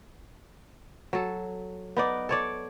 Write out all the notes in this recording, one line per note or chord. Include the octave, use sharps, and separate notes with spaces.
F#3 A4
B3 D#4 D5
A4 C#5 D5